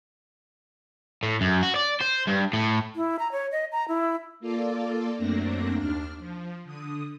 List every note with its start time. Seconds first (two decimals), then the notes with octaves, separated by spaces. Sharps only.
1.23 A2
1.41 F#2
1.63 F#4
1.76 D5
2.00 C5
2.27 G2
2.53 A2
2.96 E4
3.19 A#5
3.32 C#5
3.52 D#5
3.72 A#5
3.88 E4
4.40 A#3 F4 A4 D5
5.16 F#2 A3 A#3 C4 D4 A#6
5.77 D#2 D4 F6
6.19 F3
6.65 D3 D#6